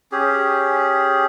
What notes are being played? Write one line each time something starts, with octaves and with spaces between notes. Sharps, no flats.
C#4 G4 G#4